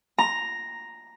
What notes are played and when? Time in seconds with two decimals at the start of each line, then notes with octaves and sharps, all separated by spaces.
0.18 A#5